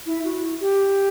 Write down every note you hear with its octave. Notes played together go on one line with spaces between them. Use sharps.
E4
F#4
G4